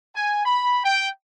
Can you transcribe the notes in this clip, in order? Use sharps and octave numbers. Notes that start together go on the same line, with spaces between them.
G#5
B5
G5